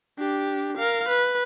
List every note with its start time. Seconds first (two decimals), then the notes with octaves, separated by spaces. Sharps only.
0.19 D4 G4
0.78 A#4 F5
1.09 B4